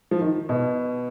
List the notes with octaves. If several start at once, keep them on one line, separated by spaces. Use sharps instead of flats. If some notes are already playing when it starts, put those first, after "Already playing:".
F3
D#3
B2